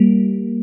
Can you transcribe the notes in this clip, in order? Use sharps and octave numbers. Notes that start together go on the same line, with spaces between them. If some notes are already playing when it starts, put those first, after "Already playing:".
Already playing: G3 A#3